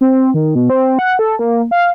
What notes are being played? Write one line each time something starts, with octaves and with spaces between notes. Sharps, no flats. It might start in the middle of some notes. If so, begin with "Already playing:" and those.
C4
D#3
B2
C4
F#5
A4
A#3
F5